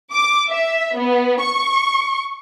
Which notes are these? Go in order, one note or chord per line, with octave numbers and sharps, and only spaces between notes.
D6
E5
B3
C#6